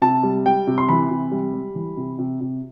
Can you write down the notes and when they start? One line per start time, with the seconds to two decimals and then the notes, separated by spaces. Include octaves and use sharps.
0.02 C3 A5
0.23 G3
0.46 G3 G5
0.67 C3
0.78 C6
0.89 E3 B5
1.10 C3
1.31 G3
1.54 G3
1.75 E3
1.97 C3
2.19 C3
2.41 C3